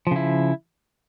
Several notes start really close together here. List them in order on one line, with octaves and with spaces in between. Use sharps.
F3 C#3 E4